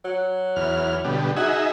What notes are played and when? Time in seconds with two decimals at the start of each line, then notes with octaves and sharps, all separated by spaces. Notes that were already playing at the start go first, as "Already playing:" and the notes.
0.05 F#3
0.56 E2 F6
1.04 B2 D3 G3
1.36 D#4 F#4 G#4 E5